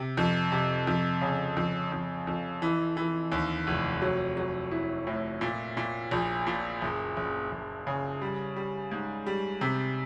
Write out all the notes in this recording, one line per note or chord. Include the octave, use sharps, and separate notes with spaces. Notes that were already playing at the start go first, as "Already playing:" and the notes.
Already playing: C3
F2
C3
F2
C#3
F2
F2
F2
E3
E3
D#2
F1
F#3
F#3
E4
A2
A#2
A#2
A#1
A#2
F#1
F#1
F#1
C#3
G3
G3
G#2
G3
C3